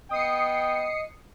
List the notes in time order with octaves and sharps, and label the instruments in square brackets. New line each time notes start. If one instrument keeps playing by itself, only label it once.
[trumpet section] B3 G5 [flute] D#5 [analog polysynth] D#6 C7 C#7